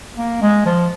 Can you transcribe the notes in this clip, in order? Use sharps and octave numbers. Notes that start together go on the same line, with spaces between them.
A#3
G#3
F3